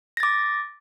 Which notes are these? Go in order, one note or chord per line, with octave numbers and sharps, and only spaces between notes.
D6 A6 A#6